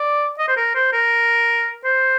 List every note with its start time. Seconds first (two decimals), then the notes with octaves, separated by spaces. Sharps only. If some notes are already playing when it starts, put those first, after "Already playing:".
Already playing: D5
0.39 D#5
0.48 C5
0.57 A#4
0.75 C5
0.93 A#4
1.84 C5